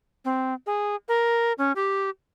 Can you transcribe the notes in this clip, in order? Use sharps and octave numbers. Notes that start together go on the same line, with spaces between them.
C4
G#4
A#4
C#4
G4